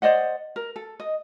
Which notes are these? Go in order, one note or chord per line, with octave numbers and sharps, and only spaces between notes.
C5 D5 D#5 F#5
A#4
A4
D#5